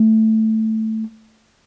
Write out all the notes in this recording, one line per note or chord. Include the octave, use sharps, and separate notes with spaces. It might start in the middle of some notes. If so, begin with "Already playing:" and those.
Already playing: A3